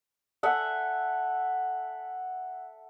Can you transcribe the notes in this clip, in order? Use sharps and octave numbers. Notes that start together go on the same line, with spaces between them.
A4 E5 F#5 G#5